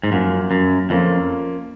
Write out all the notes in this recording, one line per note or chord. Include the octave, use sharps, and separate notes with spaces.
G#2
F#2 F3 A#3 C#4 F4
F#2
F2 F3 A#3 C#4 F4